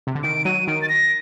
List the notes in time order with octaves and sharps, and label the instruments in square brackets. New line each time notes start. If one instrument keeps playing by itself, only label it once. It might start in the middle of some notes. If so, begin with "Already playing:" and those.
[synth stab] C3
D3
[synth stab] D#3 [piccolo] D7
[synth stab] F#3 [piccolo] D#7
[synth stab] D#3 [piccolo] D7
[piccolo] A6
A#6